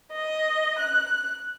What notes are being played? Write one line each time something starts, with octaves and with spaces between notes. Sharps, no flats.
D#5
F#6